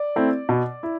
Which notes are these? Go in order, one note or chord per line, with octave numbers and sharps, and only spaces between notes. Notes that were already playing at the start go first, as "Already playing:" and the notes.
Already playing: D5
A3 C4 E4
B2
E4